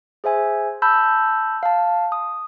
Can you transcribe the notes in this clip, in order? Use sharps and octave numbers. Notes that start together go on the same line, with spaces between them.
G#4 C5 E5 G#5
A5 B5 E6 G6
F5 A5
D#6